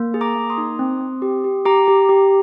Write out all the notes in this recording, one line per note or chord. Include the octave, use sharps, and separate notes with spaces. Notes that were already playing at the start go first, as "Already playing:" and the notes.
Already playing: A#3
G#4
A#5 D6
A#3
C6 D#6
D#4
C4
C4
G4
G4
G4 A#5 D6
G4
G4